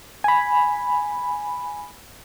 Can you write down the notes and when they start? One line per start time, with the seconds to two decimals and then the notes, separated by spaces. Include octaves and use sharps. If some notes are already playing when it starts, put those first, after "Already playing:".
0.24 G#5 B5